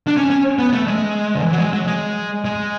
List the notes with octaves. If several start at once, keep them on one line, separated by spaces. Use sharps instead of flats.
D4
C#4
C#4
B3
A3
G#3
D3
E3
F#3
G#3
F#3
G#3
G#3